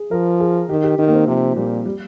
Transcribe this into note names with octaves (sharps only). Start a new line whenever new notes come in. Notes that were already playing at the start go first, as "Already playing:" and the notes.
Already playing: G#4
F3 A#4
G#4
D#3 G4
G4
D#3 D#4
A#3
C4
C3 F3
A#2 G3
G3